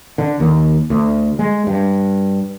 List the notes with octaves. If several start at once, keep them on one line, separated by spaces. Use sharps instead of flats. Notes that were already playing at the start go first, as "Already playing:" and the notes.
D3
D#2
D2
G#3
G2